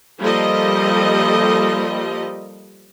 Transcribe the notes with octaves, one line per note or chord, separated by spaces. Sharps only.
F3 G3 A#3 A4 D#5